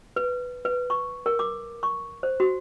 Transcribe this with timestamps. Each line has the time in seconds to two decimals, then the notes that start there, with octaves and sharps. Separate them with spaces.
0.16 B4
0.65 B4
0.90 C#6
1.26 A#4
1.39 D6
1.83 C#6
2.23 C5
2.40 F#4